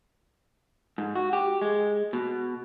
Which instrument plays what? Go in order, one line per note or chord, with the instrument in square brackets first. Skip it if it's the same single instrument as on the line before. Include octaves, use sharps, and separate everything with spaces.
[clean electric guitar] G#2
F#4
G4
G#3
B2